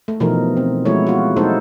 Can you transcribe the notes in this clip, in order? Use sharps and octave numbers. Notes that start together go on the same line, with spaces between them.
A3
B2 E3 F3 A3 D#4 A#4
C4
F3 G#3 A3 E4 F#4 C#5
F4 F#4
F#3 A3 D#4 E4 A4 C5